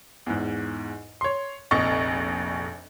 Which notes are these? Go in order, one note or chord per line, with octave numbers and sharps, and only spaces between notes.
E2 G#2
C#5 C6
F1 A#1 F2 D#5 C#6 A6